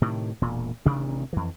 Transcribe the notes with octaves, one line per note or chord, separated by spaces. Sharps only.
A2 C3 D#3
E1 A#2
A1 C3 D#3 D4
F2 E3